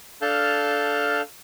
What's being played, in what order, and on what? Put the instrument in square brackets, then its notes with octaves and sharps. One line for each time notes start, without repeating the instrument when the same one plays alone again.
[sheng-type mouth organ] D4 A4 F5 A5 F6 G6